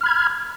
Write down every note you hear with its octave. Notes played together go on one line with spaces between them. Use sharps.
B5 F6 G#6